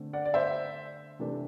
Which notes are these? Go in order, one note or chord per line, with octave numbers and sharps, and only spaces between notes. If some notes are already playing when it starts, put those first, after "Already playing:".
Already playing: D3 A3 C4
D5 F#5
D5
C5 E5
C3 E3 A3 D4